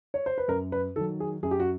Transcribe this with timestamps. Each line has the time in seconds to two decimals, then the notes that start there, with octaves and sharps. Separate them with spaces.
0.14 C#5
0.26 C5
0.38 B4
0.48 F#2 A#4
0.72 B4
0.96 D#3 F#3 A4
1.20 G#4
1.43 F#2 G#4
1.51 G4
1.60 F#4